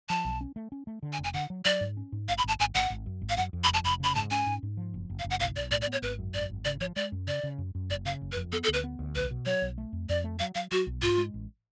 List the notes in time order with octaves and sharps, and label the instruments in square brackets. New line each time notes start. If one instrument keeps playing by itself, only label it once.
[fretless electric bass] F3 [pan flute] A5
[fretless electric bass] B1
C#4
A3
C#4
A3
D3
[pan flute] G#5
[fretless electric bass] F1
[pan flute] G#5
[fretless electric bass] D3 [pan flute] F#5
[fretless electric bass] F#3
[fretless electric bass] F#3 [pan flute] D5
[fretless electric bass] G#2
C#4
G#2
[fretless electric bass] G#1 [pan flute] F5
[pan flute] B5
[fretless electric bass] G#1 [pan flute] A5
[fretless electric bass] G#1 [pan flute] G#5
[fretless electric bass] G#1 [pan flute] F#5
[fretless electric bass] G#1
F#2
G#1
[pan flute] F5
[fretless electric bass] F#2 [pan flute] F#5
[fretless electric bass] F2
[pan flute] B5
[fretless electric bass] F1
[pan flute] A5
[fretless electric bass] F1 [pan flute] B5
[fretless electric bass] C#3 [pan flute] B5
[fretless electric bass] G#2 [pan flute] A5
[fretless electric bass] C#4 [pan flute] G#5
[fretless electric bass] G#2
G#2
F3
F#1
F#1
[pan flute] F5
[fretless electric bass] F#1
[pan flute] F#5
[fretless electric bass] B1 [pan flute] F5
[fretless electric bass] B1 [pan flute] D5
[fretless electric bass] A2 [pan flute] D5
[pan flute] D5
[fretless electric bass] B3 [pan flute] C#5
[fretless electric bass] G#1 [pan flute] B4
[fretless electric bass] F#2
[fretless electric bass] G#1 [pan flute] D5
[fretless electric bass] G#1
[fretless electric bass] C#3 [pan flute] D5
[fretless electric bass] F3 [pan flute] C#5
[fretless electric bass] G#3 [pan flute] D5
[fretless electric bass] F#2
[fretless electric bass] C#3 [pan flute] D5
[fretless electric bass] C#3
F#2
F#2
[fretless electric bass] F#1 [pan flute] D5
[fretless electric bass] C#3 [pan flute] F5
[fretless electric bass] F#1
[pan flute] B4
[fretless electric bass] F2
[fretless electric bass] B3 [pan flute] A4
[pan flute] A4
[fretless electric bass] D2
[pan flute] B4
[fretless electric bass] B3
D2
[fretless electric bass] B1 [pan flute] B4
[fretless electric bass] B2
[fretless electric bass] F#3 [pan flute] C#5
[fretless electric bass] B1
A3
F2
[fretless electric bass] F2 [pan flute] D5
[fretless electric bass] A3
[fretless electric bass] F#3 [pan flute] F5
[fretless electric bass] F#3 [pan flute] F5
[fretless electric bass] F#3 [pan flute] F#4
[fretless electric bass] B1
[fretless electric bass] G#2 [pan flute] F4
[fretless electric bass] G#3
A1